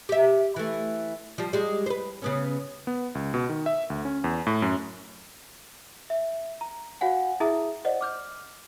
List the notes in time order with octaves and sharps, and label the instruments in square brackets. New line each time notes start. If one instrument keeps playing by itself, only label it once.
[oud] G4 E5
E3 A3
F3 G3
G3 G#3
B4 C5
C#3 B3 C#4
[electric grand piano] B3
C#2
B2
D#3
E5
D2
C#4
E2
A2
F#2
[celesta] E5
A#5
F#4 C#5 F5 F#5 G#5
E4 G#4 E5 A#5 D#6
C5 D5 D#5 F#5
D6 F6 G6